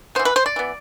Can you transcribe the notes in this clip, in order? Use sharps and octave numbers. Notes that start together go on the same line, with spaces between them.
E3 B3 C5
B4
C5
D5
E3 B3